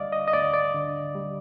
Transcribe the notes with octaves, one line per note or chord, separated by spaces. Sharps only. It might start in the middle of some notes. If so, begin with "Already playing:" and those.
Already playing: D2 D3 G3 D5 D#5 F5
D#5
D#5
D2 D5
D5
D3
G3